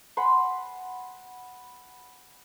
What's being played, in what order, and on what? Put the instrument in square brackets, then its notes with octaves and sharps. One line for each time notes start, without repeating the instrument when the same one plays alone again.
[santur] F#5 G#5 B5 C6